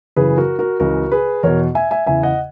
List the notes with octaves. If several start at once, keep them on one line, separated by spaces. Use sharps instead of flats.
F#2 C#3 E3 G#4 B4
F#4 A#4
F#4 A#4
C#2 C#3 E3 F#4 A#4
G#4 B4
E2 B2 A#4 C#5
E5 G#5
E5 G#5
E2 C#3 E3 E5 G#5
D#5 F#5